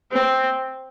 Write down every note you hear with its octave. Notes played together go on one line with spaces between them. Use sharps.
C4